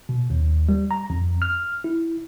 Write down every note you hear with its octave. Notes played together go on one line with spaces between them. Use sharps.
B2
D#2
G3
A#5
F2
F6
E4